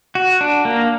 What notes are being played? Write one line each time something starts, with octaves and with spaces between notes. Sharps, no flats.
F#4
D4
A#3